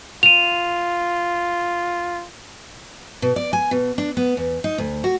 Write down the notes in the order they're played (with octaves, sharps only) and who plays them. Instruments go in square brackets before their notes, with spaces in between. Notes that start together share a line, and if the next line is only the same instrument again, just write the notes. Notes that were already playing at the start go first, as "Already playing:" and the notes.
[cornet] F4 [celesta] D#7 F7
[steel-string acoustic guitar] B2
D5
G#5
B2
D4
B3
E2
D#4
D2
F#4